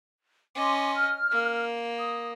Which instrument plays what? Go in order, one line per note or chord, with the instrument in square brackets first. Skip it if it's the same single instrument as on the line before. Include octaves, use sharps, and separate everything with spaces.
[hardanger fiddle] C#4 D#5 [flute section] C6 D6
[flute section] F6
[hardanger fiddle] A#3
[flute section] D#6